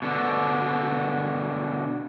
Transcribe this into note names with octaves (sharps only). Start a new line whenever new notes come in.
B2 D3